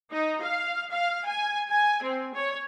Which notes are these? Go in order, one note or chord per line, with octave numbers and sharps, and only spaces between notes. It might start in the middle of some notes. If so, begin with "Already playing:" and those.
D#4
F5
F5
G#5
G#5
C4
C#5